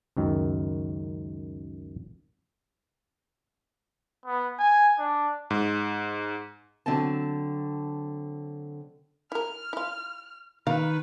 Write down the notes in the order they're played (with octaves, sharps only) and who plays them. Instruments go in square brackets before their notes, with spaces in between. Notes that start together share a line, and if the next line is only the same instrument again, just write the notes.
[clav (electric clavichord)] C#2 F#2 D#3
[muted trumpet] B3
G#5
D4
[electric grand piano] G#2
[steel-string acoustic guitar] D3 F#3 C4 A5
[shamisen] E4 A#4 [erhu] F6
[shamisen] E4 F4
[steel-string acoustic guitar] D#3 [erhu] B4 [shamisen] F5